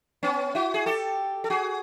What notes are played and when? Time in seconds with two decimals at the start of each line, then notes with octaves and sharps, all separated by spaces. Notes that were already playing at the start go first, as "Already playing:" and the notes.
0.23 B3 C#4
0.55 E4 F#4
0.74 G#4
0.86 G4 A4
1.44 A4
1.50 F#4 G#4